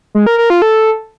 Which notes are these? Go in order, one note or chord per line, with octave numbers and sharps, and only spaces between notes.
G#3
A#4
A#4
F4
A4